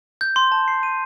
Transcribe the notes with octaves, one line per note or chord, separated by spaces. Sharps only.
G6
C6
A5
C7
D#7